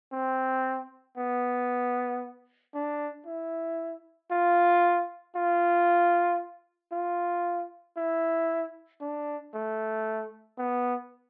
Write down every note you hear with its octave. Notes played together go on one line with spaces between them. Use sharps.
C4
B3
D4
E4
F4
F4
F4
E4
D4
A3
B3